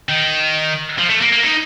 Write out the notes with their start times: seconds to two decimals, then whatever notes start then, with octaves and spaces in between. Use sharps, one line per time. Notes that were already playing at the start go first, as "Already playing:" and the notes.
0.09 D#3
0.99 F3
1.10 A3
1.21 A#3
1.33 A#3
1.44 D#4